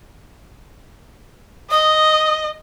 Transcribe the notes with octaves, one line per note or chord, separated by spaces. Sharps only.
D#5 D#6